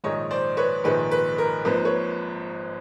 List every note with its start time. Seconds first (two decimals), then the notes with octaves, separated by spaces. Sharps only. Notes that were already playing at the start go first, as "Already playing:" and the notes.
0.04 A#1 G#2 D#3 G#3 C#5 D#5
0.31 C5 D5
0.57 B4 C#5
0.84 A#1 G#2 D#3 G#3 B4
1.11 B4
1.38 A#4
1.65 G#1 G#2 F3 A#3 B4
1.85 B4 C#5